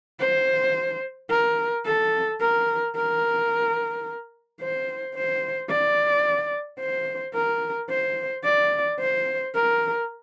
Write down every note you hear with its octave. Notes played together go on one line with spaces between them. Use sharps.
C5
A#4
A4
A#4
A#4
C5
C5
D5
C5
A#4
C5
D5
C5
A#4